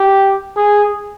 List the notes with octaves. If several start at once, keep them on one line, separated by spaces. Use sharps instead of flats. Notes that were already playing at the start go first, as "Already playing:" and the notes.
Already playing: G4
G#4